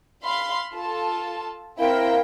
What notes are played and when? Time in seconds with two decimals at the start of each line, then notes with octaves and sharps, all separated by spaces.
0.24 F5 B5 C6
0.74 F4 A4 A5
1.79 C4 E4 A#4 F5 G5